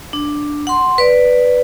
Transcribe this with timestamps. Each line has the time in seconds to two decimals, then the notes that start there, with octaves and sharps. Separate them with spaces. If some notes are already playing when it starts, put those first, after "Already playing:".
0.13 D4
0.67 F#5 C6
0.98 B4 D5